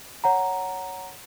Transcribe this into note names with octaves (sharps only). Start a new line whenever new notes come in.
C#5 F#5 A#5